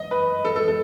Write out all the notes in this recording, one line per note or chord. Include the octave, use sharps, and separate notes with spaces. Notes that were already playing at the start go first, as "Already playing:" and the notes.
Already playing: D#5
B4
A4
A4
A4